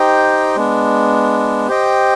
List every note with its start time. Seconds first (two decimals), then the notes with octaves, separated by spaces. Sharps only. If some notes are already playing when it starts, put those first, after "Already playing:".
Already playing: D#4 G4 C5 D#5 G5
0.56 G#3 B3 D4
1.68 G4 C5 D#5 G5